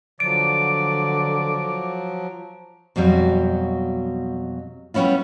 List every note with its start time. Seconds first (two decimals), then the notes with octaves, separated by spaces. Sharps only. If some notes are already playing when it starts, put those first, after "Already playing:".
0.20 D3 F3 F#3 D5 D7
2.96 F2 B2 F#3 G3
4.94 G3 B3 C#4 E4 F4